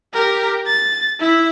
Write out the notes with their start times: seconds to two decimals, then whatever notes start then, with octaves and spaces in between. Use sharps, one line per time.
0.14 G4 A#4
0.67 A6
1.20 E4 E5